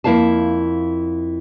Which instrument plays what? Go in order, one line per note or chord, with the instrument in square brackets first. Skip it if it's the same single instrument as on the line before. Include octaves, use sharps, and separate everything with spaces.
[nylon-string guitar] F2 A#3 E4 C5 F5 A5